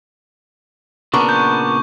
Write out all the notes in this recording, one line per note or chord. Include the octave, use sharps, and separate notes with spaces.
A#2 C#3 B3 D4 A#4 C#6
G6